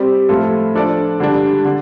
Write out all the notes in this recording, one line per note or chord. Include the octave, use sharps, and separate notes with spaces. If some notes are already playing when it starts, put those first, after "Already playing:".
Already playing: G3 C4 G4 D5
A2 F3 A3 F4 A4
F3 D4 A4 D5
D3 G3 D4
D3